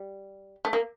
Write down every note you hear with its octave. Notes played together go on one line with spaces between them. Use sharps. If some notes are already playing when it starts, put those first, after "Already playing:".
Already playing: G3
A3
A#3